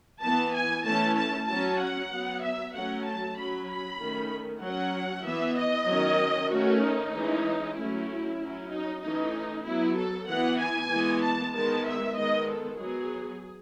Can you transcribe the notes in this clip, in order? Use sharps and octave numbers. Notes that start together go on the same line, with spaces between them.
E3 B3 A5
G#5
E3 A3 C#4 A5
A5
F#3 C#4 A5
F#5
F#3 B3
E5
F#3 A3 C#4 F#5
A5
F#3 C#4 B5
B5
D#3 A3 C#4
F#3 C#4 F#5
E3 B3 E5
D#5
D#3 F#3 C#4
D#3 A3 C#4 F#4
D#4
E3 G#3 C#4
F#3 A3 C#4 E4
F#3 C#4
D#4
E3 A3 C#4 D#4
F#3 B3 E4
A4
E3 B3 F#5
G#5
E3 G#3 B3
A5
D#3 G#3 B3 A5
E5
D#3 G#3 B3 D#5
A4
F#3 B3 G#4